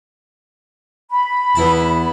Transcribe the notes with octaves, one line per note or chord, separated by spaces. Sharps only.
B5
E2 B3 E4 A5